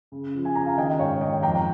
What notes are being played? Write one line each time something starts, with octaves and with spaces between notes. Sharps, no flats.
C#3
F3
G#5
C#3 A#5
F5 G#5
D#3 D#5 G5
D#5
G#2 C#5 F5
D#3 D#5 G5
F2 G5 A#5